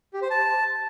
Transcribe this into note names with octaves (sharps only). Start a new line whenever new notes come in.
G4
C5
A5